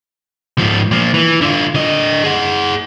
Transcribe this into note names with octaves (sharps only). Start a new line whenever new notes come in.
G#2 F3
A#2 F3
E3
D3 F4
D3 D#5
G#4 F#5